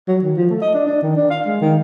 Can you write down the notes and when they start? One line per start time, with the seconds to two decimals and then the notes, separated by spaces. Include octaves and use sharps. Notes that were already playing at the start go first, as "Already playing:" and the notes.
0.08 F#3
0.22 D#3
0.37 F3
0.50 A3
0.62 D#5
0.74 D4
0.87 D4
1.03 D#3
1.17 D4
1.30 F5
1.46 G#3
1.61 D#3